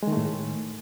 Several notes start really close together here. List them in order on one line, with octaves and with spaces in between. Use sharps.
G#3 D#3 A3 A2